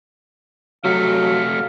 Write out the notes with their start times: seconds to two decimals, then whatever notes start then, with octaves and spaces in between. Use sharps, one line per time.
0.84 C3 F#3 A3 F5